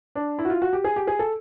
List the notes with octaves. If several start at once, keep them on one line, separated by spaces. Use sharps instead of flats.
D4
E4
F#4
F4
F#4
G4
G#4
G4
G#4
A4